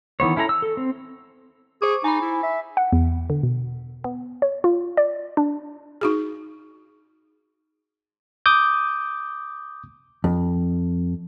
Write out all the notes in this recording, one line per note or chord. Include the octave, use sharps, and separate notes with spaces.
D#3 E3 B3 C#5
C#4 E4 A4 F5 A#5
E6
A4
C4
G#4 C5 C#6 D6
D#4 G#5 B5
E4
E5
F#5
E2
D3
B2
B3
C#5
F4
D5
D4
D#4 F#4 G#4
D6 D#6 G6
F2